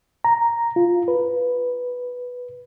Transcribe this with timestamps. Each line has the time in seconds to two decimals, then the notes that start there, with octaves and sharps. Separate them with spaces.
0.25 A#5
0.76 F4
1.08 B4